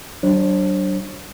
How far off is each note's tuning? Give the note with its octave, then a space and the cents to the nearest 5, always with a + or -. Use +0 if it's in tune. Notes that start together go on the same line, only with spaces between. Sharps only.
F#3 +40 D4 +0 C5 +45